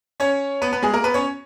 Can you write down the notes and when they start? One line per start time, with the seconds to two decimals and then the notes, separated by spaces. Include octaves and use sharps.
0.20 C#4 C#5
0.62 B3 B4
0.73 B3 B4
0.83 G#3 G#4
0.94 A#3 A#4
1.04 B3 B4
1.14 C#4 C#5